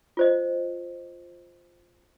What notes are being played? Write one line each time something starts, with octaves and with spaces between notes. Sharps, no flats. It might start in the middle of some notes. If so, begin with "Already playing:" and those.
F4 C5 D#5